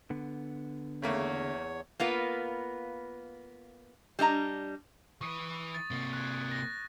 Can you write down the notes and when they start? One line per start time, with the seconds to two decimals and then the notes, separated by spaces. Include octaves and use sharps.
0.10 D3 B3
1.02 E2 C#3 A3 A#3 C#5
2.00 A#3 B3 F4 B4
4.19 G3 D4 D#5 A#5
5.21 E3 B4 C#6 D#6
5.75 A6
5.91 C3 A#3
6.13 F#6 G#6
6.51 A#6